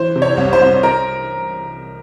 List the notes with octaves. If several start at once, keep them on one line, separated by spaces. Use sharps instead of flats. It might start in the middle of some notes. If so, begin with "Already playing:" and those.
Already playing: E3 C5
C3
C#5
C2
C5
C2
A#4